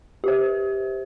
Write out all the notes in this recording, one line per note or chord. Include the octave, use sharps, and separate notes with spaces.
G4 C5